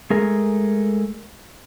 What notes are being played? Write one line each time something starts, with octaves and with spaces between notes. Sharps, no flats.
G#3 A3 G#4 A#4